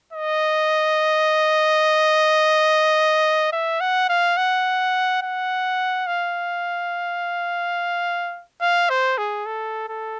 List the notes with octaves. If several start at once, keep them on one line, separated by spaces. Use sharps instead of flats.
D#5
E5
F#5
F5
F#5
F#5
F5
F5
C5
G#4
A4
A4